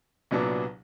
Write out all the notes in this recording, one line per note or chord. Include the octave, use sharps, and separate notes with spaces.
C2 A#2 F#3 B3 D4